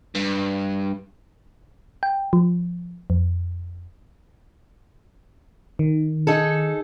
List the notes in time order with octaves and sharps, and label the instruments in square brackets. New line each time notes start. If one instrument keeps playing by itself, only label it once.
[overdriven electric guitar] G2
[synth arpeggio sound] G5
F3
F2
[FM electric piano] D#3
[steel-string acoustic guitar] D#4 G#4 A4